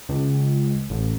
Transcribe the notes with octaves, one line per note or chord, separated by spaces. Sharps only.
C#2
A1